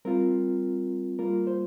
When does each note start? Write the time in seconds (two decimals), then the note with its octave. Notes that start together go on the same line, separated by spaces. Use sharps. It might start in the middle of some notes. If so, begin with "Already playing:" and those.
0.05 G3 C4 F4 A#4
1.19 G3 A#3 F4 A#4
1.47 C5